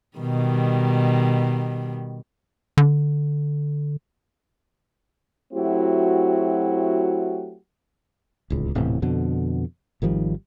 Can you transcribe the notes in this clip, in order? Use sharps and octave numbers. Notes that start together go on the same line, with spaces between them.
B2 D#3 G3
D3
F#3 A3 C4 E4 F#4 G4
D1 C#2
D#1 A2 C3 E3
F2 B2 D3
G#1 D#3 F3 G3